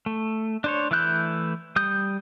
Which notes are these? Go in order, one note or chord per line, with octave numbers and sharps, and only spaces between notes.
A3
D4 C5 C#5
E3 A3 E4 F#6 G6
G3 D#6 G6